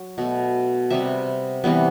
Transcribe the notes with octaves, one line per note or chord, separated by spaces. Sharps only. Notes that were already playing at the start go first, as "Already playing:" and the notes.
Already playing: F#3
B2 A3
C3 G3 B3 E5
C3 E3 G3 B3